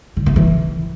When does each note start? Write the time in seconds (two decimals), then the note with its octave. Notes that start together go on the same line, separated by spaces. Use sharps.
0.17 D3
0.26 C3
0.36 E3